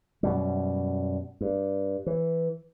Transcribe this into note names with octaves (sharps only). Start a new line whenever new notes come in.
F#2 B2 G3
G2
E3